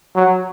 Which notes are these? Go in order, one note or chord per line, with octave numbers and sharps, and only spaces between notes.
F#3